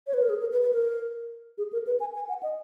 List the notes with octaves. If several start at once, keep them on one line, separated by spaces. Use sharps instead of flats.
C#5
B4
A#4
G#4
A#4
B4
B4
A#4
G#4
A#4
B4
G#5
G#5
F#5
D#5